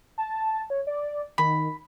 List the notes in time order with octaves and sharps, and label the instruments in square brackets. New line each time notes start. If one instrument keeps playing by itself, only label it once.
[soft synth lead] A5
C#5
D5
[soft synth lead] D#3 [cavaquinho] B5